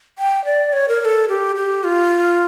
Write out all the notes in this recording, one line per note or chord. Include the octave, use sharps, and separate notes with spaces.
G5
D5
C#5
A#4
A#4
A4
G4
G4
F4